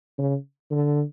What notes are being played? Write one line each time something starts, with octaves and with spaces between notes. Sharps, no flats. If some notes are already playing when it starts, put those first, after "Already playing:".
C#3
D3